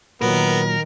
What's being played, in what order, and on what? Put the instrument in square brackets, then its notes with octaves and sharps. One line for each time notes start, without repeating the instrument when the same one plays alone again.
[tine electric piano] A#2 F#3 [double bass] D#3 [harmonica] B3 [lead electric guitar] A#4